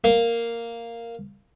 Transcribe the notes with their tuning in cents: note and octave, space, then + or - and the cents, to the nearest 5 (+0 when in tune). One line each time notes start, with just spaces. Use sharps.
A#3 -5